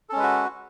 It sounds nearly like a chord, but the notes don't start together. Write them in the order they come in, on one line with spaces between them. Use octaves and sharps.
A4 C#4 G#3 B4 F#4